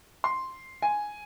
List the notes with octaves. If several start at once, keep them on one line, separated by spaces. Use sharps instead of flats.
C6
G#5